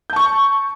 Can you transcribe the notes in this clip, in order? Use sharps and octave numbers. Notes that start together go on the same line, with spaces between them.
A5 C#6 G6